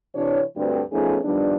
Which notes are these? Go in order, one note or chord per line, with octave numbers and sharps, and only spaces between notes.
C3 E3 D4 C#5
D2 G2 C4
F3 A3 B3 C#4 D#4 G#4
D#3 F3 G3 B3 D4